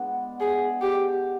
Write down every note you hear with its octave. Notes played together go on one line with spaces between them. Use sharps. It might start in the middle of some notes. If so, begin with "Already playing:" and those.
Already playing: G#3 B3 D4
G#4
G4